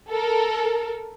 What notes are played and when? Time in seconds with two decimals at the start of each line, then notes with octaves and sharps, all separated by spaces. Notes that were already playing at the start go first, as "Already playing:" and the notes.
0.10 A4 A#4